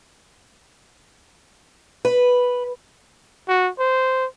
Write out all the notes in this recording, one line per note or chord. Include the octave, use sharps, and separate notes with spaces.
B4
F#4
C5